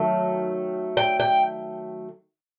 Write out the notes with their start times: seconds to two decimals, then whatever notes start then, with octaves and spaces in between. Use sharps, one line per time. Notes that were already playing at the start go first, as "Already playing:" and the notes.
Already playing: D#3 F#3 A3
0.97 G5
1.20 G5